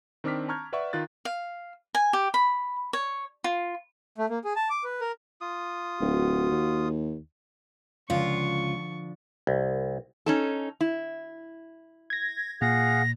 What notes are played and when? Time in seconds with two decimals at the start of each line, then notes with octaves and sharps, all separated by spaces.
0.24 D#3 C4 D4 D6 F6 B6
0.48 A5 A#5 C#6 F6 G6 G#6
0.73 B4 D5 E5 F#5 C#6
0.93 D#3 F4 F#6 A6
1.25 F5
1.95 G#5
2.13 G4
2.34 B5
2.93 C#5
3.44 F4
4.18 A3
4.30 A#3
4.45 G#4
4.56 A5
4.70 D6
4.84 B4
5.01 A#4
5.41 F4 D#6
6.00 D1 F#4
6.51 D#2
8.10 C#2 D3 F3 F4 C#6
9.47 C2
10.26 C#4 D#4 A4
10.81 E4
12.10 G#6 A#6
12.61 A#2 G#4 F5 F#5 A#6